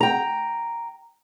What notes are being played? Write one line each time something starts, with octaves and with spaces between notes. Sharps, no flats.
G5 A#5